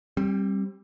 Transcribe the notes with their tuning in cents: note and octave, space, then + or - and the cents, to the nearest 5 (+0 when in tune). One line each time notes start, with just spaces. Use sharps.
G3 +0 C4 +35